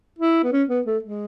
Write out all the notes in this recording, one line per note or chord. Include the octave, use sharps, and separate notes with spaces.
E4
B3
C#4
B3
A3
G#3